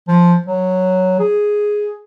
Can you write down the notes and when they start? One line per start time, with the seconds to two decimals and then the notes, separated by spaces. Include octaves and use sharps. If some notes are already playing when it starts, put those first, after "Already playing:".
0.08 F3
0.46 F#3
1.19 G#4